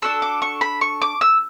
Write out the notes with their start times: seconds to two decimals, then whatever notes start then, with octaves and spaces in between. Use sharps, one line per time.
0.02 D4 F#4 A4 E6
0.22 D6
0.42 C#6
0.61 B5
0.81 C#6
1.02 D6
1.21 E6